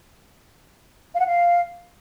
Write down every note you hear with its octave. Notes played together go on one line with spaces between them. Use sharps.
F5
F#5
F5